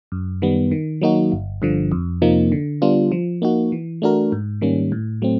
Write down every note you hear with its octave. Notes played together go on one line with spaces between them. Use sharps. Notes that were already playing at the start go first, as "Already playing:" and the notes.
F#2
D#3 G3 B3
D#3
F#3 A#3 D#4 F#4
G1
G2 D3 F3
F2
C3 F3 A#3 D#4
D3
G3 B3 D4 F4
F3
A#3 D#4 F#4
E3
A3 D4 F#4 A#4
G#2
D#3 G3 A#3 C#4
A2
F#3 A3 C4